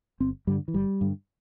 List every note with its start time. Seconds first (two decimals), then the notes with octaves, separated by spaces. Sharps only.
0.20 G1 C4
0.47 G2 D3 G3
0.68 E3
0.74 G1 G3
1.01 G2 D3